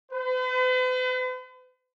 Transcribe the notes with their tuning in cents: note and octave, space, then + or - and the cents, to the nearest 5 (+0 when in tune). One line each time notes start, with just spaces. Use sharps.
B4 +45